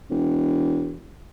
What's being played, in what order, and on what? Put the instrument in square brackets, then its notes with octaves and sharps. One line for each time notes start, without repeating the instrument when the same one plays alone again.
[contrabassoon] E1